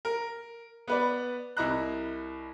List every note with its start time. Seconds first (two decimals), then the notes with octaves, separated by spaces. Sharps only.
0.05 A#4
0.88 B3 B4 D5
1.57 C2 E4 D#5 A#5 F#6